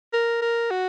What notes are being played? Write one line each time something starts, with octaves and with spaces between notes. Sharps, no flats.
A#4
A#4
F#4